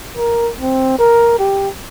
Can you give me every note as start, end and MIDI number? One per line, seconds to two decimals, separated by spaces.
0.17 0.52 70
0.61 0.97 60
0.99 1.34 70
1.39 1.69 67